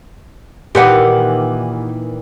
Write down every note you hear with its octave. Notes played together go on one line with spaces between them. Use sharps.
A#2 D#3 E3 G4 B4 F#5